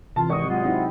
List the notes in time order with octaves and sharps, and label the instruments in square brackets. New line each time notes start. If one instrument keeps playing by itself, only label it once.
[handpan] C3 [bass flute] E3 [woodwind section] F4 [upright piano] A5
[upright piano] G#1 D#6 [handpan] D#5 [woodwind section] C#6
[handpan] F#3 [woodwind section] G#3 F4 [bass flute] F#5
[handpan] C4 E4 [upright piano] D#4